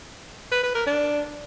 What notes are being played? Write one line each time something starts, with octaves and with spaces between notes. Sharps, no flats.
B4
B4
A#4
D4